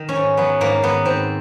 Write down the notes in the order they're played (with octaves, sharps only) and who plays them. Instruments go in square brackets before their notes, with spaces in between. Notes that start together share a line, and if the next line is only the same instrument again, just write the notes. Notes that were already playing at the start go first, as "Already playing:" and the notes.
Already playing: [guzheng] D#3
C#4
G#2
F#3 B3
G#2 A#3
D#3 B3
G#2 C4